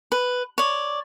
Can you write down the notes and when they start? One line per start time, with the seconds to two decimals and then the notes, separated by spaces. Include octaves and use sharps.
0.12 B4
0.58 C#5 D5